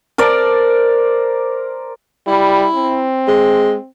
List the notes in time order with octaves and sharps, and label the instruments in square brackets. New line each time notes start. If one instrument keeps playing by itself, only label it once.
[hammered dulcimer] A#4 C5 D5 A5
[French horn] G3 [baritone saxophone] E4
[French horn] C4
[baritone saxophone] G#3